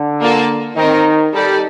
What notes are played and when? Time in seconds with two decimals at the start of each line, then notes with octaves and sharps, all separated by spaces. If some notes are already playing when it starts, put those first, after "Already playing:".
Already playing: D3
0.21 A#3 F4 A4 D5 A5
0.77 D#3 C4 D#4 A#4 D#5
1.34 G3 D#4 A4 D5